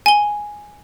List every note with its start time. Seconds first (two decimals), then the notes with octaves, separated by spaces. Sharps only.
0.06 G#5 G7